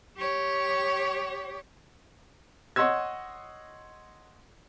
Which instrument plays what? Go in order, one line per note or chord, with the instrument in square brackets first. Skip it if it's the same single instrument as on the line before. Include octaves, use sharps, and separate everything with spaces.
[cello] G4 C#5
[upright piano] C#5 D#5 F#5 C6 E6 G#6